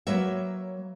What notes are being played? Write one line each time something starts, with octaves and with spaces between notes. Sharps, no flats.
F#3 A#3 B4 C#5 E5